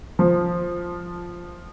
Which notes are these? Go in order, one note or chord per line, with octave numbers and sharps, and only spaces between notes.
F3